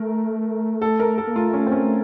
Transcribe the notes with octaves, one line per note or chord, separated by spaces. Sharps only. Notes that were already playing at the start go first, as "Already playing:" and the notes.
Already playing: A3 A#4
A4
A#4
A4
A#3
A3 F4
C#4
C4
C#4